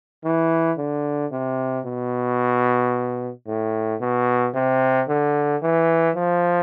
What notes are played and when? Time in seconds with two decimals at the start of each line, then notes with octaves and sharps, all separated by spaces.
0.25 E3
0.78 D3
1.32 C3
1.86 B2
3.47 A2
4.00 B2
4.55 C3
5.08 D3
5.62 E3
6.16 F3